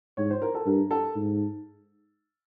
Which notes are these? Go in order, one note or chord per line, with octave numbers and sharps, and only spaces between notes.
G#2 C#5
C5
A#4
A4
G2 A#4
A4
G#2